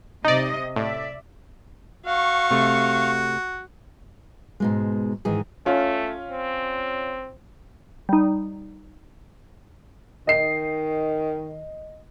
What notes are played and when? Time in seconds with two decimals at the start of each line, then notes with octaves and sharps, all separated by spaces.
0.24 C3 D#4 D5 D#5
0.76 A2 D5 E5
2.06 F#4 F5 C#6
2.51 C3 A3
4.60 G#2 B2 G#3
5.25 G#2 D#3 E3 G#4
5.66 A3 C#4 F4
6.32 C4
8.09 G3 D#4
10.27 D#3 D#5 C7